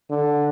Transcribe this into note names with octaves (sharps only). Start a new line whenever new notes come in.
D3